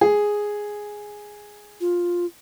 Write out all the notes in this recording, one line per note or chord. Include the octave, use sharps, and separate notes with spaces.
G#4
F4